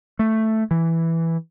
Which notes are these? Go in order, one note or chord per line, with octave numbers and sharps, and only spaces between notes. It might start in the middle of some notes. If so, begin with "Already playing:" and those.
A3
E3